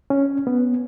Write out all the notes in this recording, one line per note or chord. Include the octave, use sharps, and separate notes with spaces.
C#4
B3